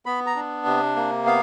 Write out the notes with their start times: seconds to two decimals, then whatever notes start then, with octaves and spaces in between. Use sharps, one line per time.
0.06 B3 B5
0.26 A#5
0.36 D4
0.66 C3
0.96 A#3
1.26 B3 F5